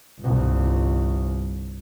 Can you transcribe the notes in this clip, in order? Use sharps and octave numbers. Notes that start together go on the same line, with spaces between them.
G1 C2